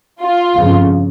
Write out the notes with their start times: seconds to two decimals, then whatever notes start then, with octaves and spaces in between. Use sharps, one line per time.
0.20 F4
0.55 G1 F2 C#3